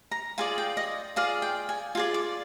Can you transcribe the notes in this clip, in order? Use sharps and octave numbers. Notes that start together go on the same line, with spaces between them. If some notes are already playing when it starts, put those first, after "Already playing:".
A#5
F4 G#4 D5 G#5
G5
D#5
F4 G#4 D5 F5
G5
G#5
F4 G#4 D5
D6